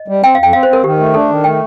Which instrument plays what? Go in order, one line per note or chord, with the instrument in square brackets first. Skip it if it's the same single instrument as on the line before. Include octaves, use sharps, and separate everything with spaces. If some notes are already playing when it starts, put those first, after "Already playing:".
Already playing: [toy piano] D#5
[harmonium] G3
[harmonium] C4 [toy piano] G5
[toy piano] F5
[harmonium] F2 [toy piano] G5
[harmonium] C4 [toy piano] F5
[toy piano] C5
[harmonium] C4 [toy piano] A#4
[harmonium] D#3 [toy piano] G4
[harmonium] A3
[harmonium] D4 [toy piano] A4
[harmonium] D#3
[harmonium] A3 [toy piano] G5